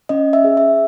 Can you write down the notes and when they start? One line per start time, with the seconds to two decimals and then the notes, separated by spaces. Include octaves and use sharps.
0.09 C#4 D#5
0.33 E5
0.44 G#4
0.57 E5